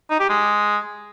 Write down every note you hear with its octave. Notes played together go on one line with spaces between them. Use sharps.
D#4
G4
G#3